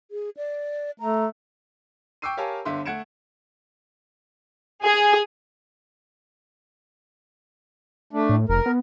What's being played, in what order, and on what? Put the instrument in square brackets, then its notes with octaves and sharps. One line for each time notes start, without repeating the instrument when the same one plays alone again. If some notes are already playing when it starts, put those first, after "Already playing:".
[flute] G#4
D5
[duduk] A3 [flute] A#5
[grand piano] G5 C#6 D6 E6 C7 D#7
G4 A#4 C#5 F5 G#5 A5
G1 D3 E5 F5 C6
A3 F#5 G#6 C#7 D7 E7
[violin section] G#4
[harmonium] A3 D4
[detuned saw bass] A2
[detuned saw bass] F1 [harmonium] A#4
[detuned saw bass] B3